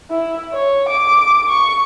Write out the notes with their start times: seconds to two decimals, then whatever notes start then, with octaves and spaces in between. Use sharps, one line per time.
0.11 E4
0.52 C#5
0.89 D6
1.49 C#6